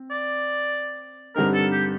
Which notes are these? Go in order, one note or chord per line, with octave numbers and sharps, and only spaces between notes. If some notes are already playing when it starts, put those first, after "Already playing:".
Already playing: C4
D5
G2 D3 G3 C4 D#4 A#4
A4
G4